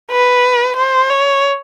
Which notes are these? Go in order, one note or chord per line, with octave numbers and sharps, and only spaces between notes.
B4
C5
C#5